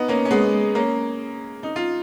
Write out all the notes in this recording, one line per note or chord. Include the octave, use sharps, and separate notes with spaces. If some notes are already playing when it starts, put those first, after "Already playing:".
Already playing: B3 D#4
A#3 C#4
C#4
G#3 B3
A#3 C#4
D#4
F4